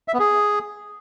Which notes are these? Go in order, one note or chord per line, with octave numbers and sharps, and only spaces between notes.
E5
B3
G#4